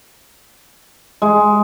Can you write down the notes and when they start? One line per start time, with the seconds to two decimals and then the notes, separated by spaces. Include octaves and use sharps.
1.22 G#3